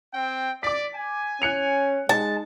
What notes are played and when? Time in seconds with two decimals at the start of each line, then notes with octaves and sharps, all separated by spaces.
0.13 C4 G5
0.63 D5 D6 B6
0.94 G#5
1.42 C#4 F#6 C#7 F7
2.09 G#3 D#4 A5